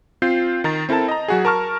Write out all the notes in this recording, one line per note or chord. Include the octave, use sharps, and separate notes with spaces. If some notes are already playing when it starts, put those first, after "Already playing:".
C4 F4 G6 C7
D#3 A#5 A6
C4 E4 A4 A#4 A5
D#5 A#5
F#3 F#4 G#4
A#4 A5 C#6 F6